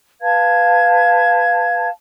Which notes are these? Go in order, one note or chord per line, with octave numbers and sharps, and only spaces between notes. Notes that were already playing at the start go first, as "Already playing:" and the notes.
B4 F5 A5 G#6